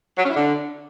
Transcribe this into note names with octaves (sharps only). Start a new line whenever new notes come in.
F#3
C#4
E4
D3